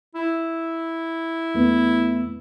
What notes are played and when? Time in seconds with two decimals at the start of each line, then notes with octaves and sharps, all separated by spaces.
0.15 E4
1.54 E2 A3 B3